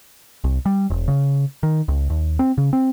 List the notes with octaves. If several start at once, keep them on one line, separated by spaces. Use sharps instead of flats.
C2
G3
E1
C#3
D#3
C#2
D#2
C4
C#3
C4